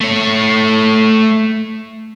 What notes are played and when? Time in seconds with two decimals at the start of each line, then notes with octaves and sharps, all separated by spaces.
0.01 A3 C#5